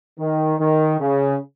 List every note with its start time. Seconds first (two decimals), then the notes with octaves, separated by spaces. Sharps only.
0.19 D#3
0.59 D#3
0.99 C#3